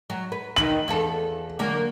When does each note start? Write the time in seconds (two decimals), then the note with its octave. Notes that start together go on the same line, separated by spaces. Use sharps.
0.10 F#3
0.32 B4
0.56 D#3 B4 F#7
0.88 E2 F4 A4
1.59 D3 F#3 A#3